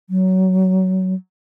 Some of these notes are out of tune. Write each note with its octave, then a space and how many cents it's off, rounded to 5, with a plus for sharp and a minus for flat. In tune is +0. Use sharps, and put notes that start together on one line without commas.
F#3 +20